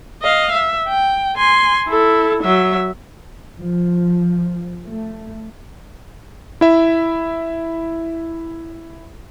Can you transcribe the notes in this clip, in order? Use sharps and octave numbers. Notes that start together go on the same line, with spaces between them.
D#5 F5
E5
G5
G#5 C6
E4 A4
F#3 E5
F3
A3
E4 E5